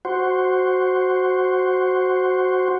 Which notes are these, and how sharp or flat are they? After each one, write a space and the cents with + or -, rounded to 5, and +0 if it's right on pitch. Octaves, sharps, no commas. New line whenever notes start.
F#4 +0 C5 +0